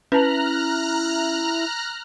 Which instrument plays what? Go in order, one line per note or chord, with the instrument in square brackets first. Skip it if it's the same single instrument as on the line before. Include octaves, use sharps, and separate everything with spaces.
[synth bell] C#4 [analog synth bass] E4 [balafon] B4 A5 [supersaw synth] A#5 F6 F#6